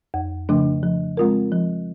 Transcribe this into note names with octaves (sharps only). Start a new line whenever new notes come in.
F2
C#3 F3 A3 D4
F3
G#3 C4 F4 A#4
F3